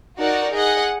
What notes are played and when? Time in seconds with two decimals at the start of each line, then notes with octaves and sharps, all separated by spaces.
0.18 D#4 F#4 A#4 D5 F#5
0.53 G#4 D#5 F#5